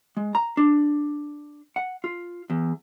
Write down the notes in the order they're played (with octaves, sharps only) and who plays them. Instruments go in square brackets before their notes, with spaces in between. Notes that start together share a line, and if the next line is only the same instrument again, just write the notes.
[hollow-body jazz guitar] G#3
A#5
D4
F#5
F4
E2